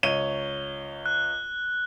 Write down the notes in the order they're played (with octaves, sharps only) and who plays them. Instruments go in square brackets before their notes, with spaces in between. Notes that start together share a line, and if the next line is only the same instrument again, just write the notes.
[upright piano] C#2 C#5 D#7 [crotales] G7
[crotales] F#6